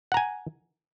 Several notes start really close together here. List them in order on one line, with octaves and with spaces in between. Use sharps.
F#5 A#5 G#5